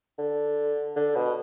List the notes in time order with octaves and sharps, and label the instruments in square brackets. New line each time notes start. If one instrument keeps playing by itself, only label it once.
[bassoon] D3
D3
B2